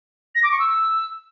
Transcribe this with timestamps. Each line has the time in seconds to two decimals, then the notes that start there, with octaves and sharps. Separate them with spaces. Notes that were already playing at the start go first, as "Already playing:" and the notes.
0.35 A#6
0.43 D6
0.51 C#6
0.60 E6